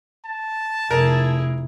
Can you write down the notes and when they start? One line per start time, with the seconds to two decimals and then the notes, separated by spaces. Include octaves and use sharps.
0.25 A5
0.91 F1 E4 G#4 A#4